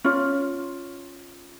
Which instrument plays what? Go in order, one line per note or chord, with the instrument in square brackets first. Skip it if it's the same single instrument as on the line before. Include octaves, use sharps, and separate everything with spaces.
[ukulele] C#4 F4